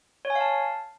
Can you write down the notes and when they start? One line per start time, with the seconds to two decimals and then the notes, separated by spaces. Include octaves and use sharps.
0.25 C#5
0.30 G#5
0.35 F5
0.41 A5